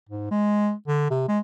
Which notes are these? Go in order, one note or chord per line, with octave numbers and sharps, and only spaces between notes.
G#2
G#3
D3
C3
G#3